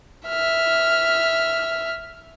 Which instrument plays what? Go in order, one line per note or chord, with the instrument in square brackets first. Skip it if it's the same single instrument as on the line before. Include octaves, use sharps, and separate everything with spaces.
[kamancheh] E5 F6